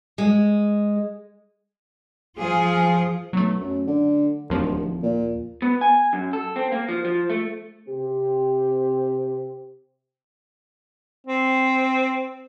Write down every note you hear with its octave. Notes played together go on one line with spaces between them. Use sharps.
G#3
F3 F4 G#4
B1 F#3 A3
F#2
D3
D1 D#2 F3
A#2
B3
G#5
F#2
A4
C4
A#3
F3
F3
A3
C3 C4 G4
C4